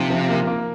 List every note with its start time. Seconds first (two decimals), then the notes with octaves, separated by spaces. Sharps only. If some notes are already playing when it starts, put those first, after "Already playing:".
Already playing: C3 F3 A#3 D#4
0.10 F3
0.29 A#3
0.47 A#3